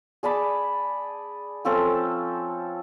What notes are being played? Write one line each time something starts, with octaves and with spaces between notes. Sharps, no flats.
G#4 D5 A5 B5
F3 C4 C#4 A4